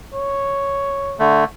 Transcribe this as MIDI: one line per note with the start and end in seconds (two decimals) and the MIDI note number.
0.14 1.19 73
1.20 1.44 50
1.20 1.44 57